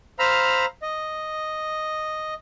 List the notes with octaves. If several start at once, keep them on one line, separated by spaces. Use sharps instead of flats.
C5 F5 A#5 B5 E6 F6
D#5